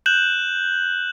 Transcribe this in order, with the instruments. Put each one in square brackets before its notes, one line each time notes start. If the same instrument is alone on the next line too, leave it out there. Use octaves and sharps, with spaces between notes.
[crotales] F#6 G6 E7 F#7